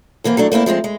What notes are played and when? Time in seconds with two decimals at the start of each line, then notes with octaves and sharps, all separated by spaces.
0.24 D3 E3 A#3 C4
0.37 F#3 A3 D4
0.52 A3 A#3 C4 E4
0.66 F3 G#3 B3 C4
0.84 G#3